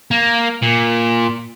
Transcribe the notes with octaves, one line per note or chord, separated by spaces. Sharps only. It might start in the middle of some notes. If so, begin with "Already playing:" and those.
A#3
A#2